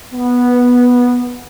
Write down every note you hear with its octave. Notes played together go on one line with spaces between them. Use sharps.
B3